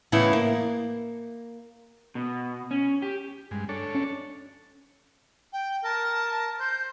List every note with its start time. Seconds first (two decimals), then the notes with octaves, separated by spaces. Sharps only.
0.12 A2 C#3 E3 B3 E4
0.33 A#3
2.15 B2
2.71 C#4
3.02 G4
3.51 G2 G#3
3.69 D4 A4 C#5
3.95 C#4
5.53 G5
5.84 A#4 A5
6.60 C5 G6